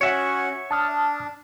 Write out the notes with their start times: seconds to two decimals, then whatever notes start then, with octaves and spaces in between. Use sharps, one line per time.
0.01 C#4 F#4 C#5 E5 F#5
0.71 D4 A5 D#6 F6